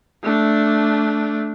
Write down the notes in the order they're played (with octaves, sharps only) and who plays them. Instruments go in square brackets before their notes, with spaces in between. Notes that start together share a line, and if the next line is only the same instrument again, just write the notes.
[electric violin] A3 D4